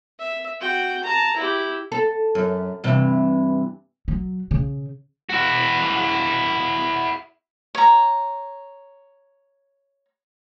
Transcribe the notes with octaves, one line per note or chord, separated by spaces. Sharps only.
E5
F#4 G5
A5 A#5
E4 G4
A4
F#2
G2 C3 E3
F#3
C#3
E4 F#4
C#5 A#5